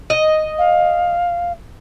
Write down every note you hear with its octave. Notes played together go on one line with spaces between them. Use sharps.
D#5
F5